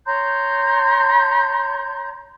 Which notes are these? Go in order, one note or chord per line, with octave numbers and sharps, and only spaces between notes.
C#5 A#5 C6 G6